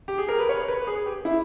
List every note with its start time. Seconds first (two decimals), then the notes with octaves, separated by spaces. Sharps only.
0.08 G4
0.18 G#4
0.29 A#4
0.39 B4
0.49 C#5
0.68 B4
0.87 G#4
1.06 G4
1.25 E4